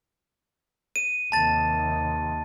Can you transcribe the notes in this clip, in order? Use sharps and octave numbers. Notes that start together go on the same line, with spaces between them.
D#7
D#2 C3 D#3 A5 A6